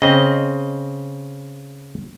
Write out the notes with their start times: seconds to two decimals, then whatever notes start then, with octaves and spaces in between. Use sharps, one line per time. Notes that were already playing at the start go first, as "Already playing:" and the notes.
0.02 C#3 C4 D#5